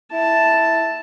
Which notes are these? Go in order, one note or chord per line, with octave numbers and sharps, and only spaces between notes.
E4 A5